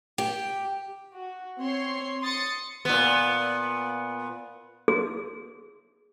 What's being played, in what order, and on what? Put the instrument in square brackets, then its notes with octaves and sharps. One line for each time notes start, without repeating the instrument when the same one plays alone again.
[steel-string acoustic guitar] G4
[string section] F#4
C4 C#5 C6
C6 D#6 A6 C#7
[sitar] A#2 B3
[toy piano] G#4